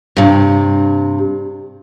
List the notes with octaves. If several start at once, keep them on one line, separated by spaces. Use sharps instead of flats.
G2 C3